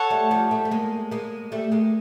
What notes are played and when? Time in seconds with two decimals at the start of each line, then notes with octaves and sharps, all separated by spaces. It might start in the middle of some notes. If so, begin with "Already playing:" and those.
Already playing: A4 C#5 F#5
0.10 G3 A3
0.31 F3 G3
0.51 G3 A3
0.65 A3
0.71 G#3 A#3
1.11 G#3 A#3
1.52 G3 A3
1.72 G#3 A#3